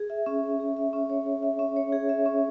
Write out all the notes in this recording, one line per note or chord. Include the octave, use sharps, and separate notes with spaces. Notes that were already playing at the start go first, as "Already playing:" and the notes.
Already playing: G#4
E5
C#4
C#5
G#4
E5
C#4
C#5
G#4
E5
C#4
C#5
G#4
E5
C#4